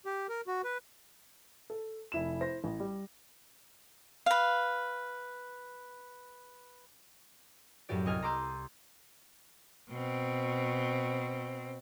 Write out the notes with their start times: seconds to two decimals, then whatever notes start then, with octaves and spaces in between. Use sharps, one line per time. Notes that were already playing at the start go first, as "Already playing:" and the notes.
0.06 G4
0.29 A#4
0.47 F#4
0.64 B4
1.70 A4
2.12 F1 E4 E7
2.41 E4 C5 A#6
2.64 A1
2.80 G3
4.26 B4 F5
7.89 F#2 A2 G4 D5
8.06 C2 D#5 G#5 F6
8.22 A#5 C6 D6 E6 G6
9.90 B2 C4